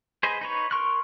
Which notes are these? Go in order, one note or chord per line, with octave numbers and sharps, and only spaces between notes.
G#4 B4 C5 D#5
D#4 B4 C#5
A#4 C6 C#6 F6 F#6